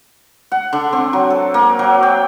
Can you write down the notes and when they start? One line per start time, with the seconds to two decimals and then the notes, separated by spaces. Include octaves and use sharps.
0.52 F#5
0.73 D3
0.93 C4
1.13 F#3
1.30 A4
1.54 A#3
1.79 F#3
2.03 G5